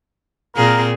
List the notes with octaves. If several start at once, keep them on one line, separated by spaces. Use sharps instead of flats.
A#2 C4 G#4 A#4 F5 A#5